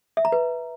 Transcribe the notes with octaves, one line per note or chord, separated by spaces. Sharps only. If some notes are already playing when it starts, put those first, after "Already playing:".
E5
A#5
B4